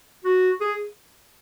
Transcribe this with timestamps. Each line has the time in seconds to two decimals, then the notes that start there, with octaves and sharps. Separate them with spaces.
0.25 F#4
0.61 G#4